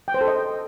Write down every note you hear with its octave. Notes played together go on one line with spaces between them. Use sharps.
G5
C5
A4
D#5